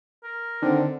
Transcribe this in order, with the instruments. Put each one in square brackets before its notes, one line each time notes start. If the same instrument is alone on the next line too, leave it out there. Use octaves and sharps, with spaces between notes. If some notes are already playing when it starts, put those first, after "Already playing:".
[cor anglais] A#4
[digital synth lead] D3 [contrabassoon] D#3 [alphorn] C4